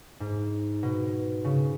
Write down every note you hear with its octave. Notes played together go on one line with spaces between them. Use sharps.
G#2
B2
C#3